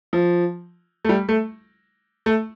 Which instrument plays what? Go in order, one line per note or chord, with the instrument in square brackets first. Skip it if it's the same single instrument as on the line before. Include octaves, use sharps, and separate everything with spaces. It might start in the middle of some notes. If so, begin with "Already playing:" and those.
[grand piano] F3
A3
G3
A3
A3